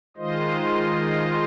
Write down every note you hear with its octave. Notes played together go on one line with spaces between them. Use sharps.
D#3 G#3 F4 C5 D#5